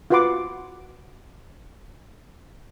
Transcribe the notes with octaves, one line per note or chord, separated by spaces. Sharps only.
F4 F#4 B4 F#5 C6 D6